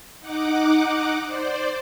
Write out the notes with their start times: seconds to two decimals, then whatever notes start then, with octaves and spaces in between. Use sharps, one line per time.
0.21 D#4 F#5 D6
1.26 C5 D5